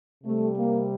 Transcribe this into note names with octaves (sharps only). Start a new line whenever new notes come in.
C3 G3 A3
A#3